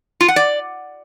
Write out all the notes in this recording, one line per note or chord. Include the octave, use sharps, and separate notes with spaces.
F4
F#5
D5